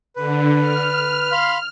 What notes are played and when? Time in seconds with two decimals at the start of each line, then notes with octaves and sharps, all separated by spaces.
0.16 D3 B4
0.60 F6
1.31 F5 B5 C6